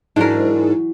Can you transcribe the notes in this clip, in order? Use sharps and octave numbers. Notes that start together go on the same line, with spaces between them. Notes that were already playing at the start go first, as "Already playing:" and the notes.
G#2 E3 F#3 D4 A#4